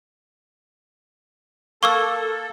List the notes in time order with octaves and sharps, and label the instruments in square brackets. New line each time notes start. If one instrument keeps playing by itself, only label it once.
[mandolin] A#3 [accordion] A4 [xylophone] C#6 D6 E6